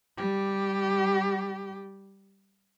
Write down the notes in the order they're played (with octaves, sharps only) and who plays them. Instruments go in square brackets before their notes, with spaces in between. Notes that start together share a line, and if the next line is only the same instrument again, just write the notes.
[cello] G3 G4